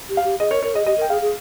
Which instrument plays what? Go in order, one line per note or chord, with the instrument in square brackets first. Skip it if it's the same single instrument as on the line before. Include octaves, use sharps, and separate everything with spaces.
[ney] G4
[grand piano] F5
[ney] G4
[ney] G#4 [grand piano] D#5
[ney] A#4 [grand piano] C#5
[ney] A#4 [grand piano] C#5
[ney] G#4 [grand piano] D#5
[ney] G4 [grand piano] D#5
[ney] A#4
[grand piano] G5
[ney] G#4 [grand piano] F5
[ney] G#4